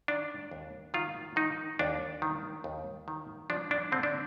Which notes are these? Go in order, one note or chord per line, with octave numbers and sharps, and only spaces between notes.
D#3 D4
D#2
D#3 F4
D#3 D#4
D#2 D4
D#3
D#2
D#3
F3 D4
D4
D3 C4
D4